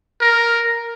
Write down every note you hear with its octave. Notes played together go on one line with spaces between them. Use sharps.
A#4